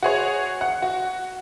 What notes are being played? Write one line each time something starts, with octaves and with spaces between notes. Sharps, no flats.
F#4 G#4 C#5
F#5
F#4